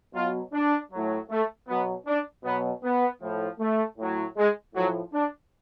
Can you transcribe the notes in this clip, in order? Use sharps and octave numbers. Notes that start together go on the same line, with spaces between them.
B2 F#3 F4
D4
A2 F#3
A3
B2 F#3 B3
D4
B2 F#3 B3
B3
A2 F3
A3
A2 F#3
G#3
A2 F3 F#3
D4